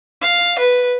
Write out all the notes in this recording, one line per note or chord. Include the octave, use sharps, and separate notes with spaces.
F5
B4